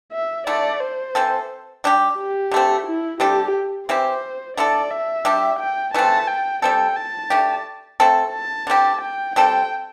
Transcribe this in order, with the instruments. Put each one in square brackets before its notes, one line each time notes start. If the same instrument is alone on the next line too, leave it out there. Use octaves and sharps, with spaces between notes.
[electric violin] E5
[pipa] D3 A3 E4 [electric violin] D5
[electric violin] C5
[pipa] E3 C4 A4
G3 D4 G4
[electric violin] G4
[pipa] D3 A3 C4
[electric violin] E4
[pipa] C3 G3 D4 A4 [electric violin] G4
[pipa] E3 C4 E4 G4 [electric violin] C5
[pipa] D3 A3 E4 A4 [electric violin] D5
[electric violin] E5
[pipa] G3 D4 G4
[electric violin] G5
[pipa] E3 A3 C4 [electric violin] A5
[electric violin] G5
[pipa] G3 C4 A4 [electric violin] G5
[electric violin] A5
[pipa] A3 D4 G4
A3 C4 A4
[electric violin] A5
[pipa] D3 C4 G4
[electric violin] G5
[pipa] G3 C4 A4 [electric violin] G5